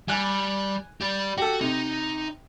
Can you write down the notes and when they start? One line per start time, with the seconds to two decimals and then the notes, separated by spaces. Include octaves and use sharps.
0.08 G3 G#5 F#6
1.01 G4 D5
1.38 F#4 G4 A4
1.61 C3 D#4